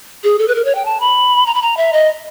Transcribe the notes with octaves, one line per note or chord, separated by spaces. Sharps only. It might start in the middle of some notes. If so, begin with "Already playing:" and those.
G#4
A4
B4
A#4
C#5
G5
A5
B5
A#5
B5
A#5
E5
D#5